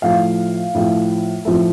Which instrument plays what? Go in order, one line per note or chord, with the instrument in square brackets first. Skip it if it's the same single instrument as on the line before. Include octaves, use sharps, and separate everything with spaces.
[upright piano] A2 F3 A3 F5
A2 F3 A3
A2 F3 A3